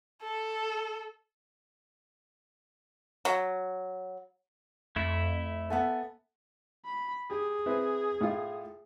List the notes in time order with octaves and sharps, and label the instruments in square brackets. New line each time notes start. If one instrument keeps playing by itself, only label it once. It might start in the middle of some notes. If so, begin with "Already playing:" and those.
[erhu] A4
[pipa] F#3
[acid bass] F2 [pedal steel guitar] A3 E4
[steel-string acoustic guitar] B3 E5 G#5 [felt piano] A4 F#5 A5
[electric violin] B5
[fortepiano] G4 [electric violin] G#4
[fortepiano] C4 E4 B4
A2 F4